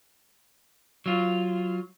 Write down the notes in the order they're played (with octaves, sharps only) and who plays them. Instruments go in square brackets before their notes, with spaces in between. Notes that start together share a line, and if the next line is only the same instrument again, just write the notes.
[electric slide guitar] F#3 F4